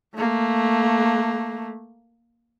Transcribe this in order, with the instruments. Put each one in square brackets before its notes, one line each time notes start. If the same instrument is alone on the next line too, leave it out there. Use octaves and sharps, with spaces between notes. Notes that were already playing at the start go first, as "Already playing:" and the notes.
[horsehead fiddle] A3 A#3